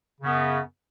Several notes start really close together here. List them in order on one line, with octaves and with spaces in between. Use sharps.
C#3 B3 F#2